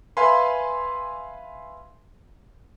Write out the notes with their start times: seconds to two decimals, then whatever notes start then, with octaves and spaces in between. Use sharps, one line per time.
0.17 B4 E5 F5 G#5 B5 C6